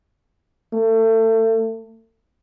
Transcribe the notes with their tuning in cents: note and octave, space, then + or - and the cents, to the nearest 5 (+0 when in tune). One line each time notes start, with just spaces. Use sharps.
A3 +30